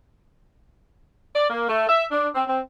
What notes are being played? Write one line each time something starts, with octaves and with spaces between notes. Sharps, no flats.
D5
A#3
A3
E5
D4
C4
C4